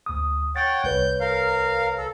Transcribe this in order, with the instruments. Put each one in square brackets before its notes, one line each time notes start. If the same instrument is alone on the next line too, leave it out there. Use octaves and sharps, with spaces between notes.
[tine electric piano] D2 D#6
[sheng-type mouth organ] C#5 F#5 G5 [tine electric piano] A6
[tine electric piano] C2 B4 C#5 [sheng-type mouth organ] G6
[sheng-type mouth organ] A#4 F5
A4